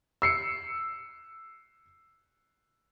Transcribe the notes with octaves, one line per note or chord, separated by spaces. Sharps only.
E6 C7 C#7